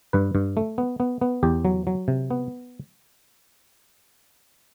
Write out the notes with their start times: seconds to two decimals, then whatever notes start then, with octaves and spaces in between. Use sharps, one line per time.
0.13 G2 B4
0.35 G2
0.57 A3
0.78 B3
1.00 B3
1.21 B3
1.43 E2 G4
1.65 F#3
1.87 F#3
2.08 C3
2.31 B3